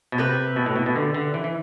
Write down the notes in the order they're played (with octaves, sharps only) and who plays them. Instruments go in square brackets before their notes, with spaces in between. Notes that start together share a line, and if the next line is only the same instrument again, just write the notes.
[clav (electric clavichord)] B2
[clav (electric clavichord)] C3 [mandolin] G4 B4 E5
[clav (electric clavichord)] B2
A2
B2
B2
D3
D3
E3
E3